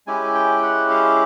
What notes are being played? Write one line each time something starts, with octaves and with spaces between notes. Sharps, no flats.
G#3 C#4 E4 G4 G#5
G5
F#5
F5